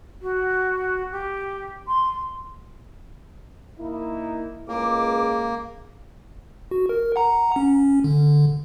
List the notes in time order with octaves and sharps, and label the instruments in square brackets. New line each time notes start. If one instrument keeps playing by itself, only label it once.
[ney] F#4
G4
C6
[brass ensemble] A#3 D#4 E4
[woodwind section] C#2 D6 [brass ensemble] C#3 G#3 [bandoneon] A#3
[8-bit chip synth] F#4
A#4
F#5 A#5
C#4
D3